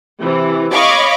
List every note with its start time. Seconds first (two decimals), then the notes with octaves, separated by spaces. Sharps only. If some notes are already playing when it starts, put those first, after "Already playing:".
0.19 C3 E3
0.73 C#5 D#5 F5 B5 C#6 D6